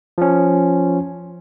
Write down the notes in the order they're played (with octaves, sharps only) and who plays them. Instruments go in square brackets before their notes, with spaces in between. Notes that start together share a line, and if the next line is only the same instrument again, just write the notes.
[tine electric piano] F3 C#4